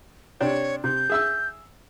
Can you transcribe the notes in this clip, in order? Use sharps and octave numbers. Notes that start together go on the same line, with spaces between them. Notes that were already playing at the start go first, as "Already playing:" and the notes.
C3 D4 C#5 G5
C3 G6
G#4 E5 E6